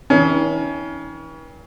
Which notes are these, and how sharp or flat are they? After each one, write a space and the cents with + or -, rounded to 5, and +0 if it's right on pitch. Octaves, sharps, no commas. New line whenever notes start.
E3 -40 C#4 +30